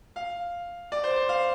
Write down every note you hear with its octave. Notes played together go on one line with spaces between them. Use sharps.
F5
D5
C5
C5
F5